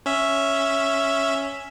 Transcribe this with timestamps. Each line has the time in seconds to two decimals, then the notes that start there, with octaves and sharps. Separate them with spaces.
0.06 C#4 E5